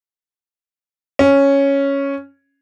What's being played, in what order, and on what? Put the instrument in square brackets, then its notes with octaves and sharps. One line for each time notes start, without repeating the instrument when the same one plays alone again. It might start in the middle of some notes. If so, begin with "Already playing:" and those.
[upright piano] C#4